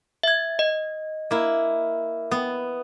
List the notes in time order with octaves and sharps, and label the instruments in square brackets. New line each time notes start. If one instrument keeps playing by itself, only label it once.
[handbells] E5 G#6
D#5
[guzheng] A#3 E4
B3